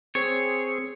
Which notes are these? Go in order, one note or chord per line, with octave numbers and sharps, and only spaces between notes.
C4 G#4 C#5